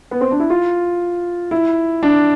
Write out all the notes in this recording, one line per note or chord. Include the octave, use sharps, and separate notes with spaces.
B3
C4
D4
E4
F4
E4
D4